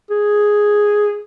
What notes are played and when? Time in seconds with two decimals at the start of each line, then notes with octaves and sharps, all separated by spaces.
0.10 G#4